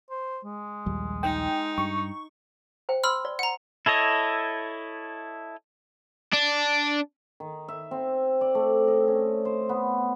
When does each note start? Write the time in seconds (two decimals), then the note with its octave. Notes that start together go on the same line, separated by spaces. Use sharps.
0.10 C5
0.45 G#3
0.86 A#1 D#2 G3
1.23 D#4 G5
1.78 G2 C#6
2.89 C5 G5
3.04 B5 C6 E6 F6
3.25 D5
3.39 F#5 A#5
3.86 E4 A4 C#5 D#5
6.33 D4
7.40 D#3
7.68 E5
7.91 C4
8.41 D5
8.55 A3
8.88 D#5
9.08 C#4
9.45 C5
9.69 B3